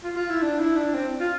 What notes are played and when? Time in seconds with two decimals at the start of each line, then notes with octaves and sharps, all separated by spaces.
0.04 F4
0.16 F4
0.30 E4
0.42 D4
0.60 E4
0.76 D4
0.94 C4
1.20 F4